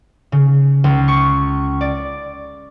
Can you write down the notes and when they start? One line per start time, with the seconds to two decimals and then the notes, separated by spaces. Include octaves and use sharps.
0.32 C#3
0.84 C#2
1.08 C#6
1.81 D5